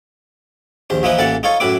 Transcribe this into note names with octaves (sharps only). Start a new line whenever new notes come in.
A#1 D#2 C5
A#2 E3 F3 D#4 E4 B4
A1 A#2 E3 A4 F#5 A5
D#4 F4 A4 C#5 F5
F#2 A2 E4 B4 E5 D6